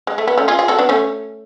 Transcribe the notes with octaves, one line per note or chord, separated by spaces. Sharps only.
G#3
A3
B3
A3 C#4
F4 G#4
F4 G#4
F#4 A4
B3 D4
A3 C#4